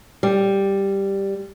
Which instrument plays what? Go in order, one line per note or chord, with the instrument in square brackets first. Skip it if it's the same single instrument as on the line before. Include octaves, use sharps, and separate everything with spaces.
[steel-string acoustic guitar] G3